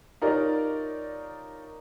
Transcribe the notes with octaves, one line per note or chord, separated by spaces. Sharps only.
D#4 F4 G4 A#4 C#5 D5